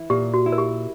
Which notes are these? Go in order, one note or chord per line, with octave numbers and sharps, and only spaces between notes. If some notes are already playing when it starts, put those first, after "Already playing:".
Already playing: E3 E4
A#2 G4
F#4
E4
A#4
G4